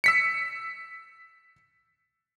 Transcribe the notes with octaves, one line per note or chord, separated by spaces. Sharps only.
E6 B6 C#7